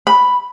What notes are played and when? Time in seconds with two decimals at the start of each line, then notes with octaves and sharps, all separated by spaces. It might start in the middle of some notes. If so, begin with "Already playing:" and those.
0.07 B5